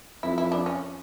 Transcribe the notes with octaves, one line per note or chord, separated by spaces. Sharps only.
F2 E4
E4
D4
C#4